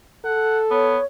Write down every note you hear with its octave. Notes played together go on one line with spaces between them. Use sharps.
A4 F#5
B3 C#5